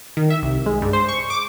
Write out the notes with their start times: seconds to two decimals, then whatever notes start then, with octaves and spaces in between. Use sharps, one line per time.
0.17 D#3
0.30 E5
0.42 C2
0.66 G#3
0.82 G2
0.93 C5
1.09 C#6
1.30 D6